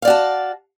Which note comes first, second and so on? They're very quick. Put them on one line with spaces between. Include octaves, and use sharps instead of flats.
F5 D5 F#4 A5